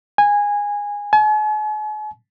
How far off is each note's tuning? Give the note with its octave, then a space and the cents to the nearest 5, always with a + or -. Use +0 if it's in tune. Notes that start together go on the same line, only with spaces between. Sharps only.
G#5 -15
G#5 +45